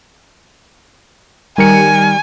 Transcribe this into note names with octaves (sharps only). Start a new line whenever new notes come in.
D#3 G3 A#4 G#5 C#7